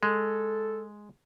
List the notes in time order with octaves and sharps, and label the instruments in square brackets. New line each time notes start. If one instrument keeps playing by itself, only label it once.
[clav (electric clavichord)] G#3 [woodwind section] A4